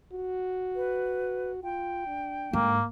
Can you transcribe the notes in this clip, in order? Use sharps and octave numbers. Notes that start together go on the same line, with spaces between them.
F#4
B4
F4 G5
D4
G#2 D3 A#3